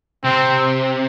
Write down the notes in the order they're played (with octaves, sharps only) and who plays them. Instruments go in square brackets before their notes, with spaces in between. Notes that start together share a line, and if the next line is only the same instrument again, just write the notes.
[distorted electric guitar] C3 [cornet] C4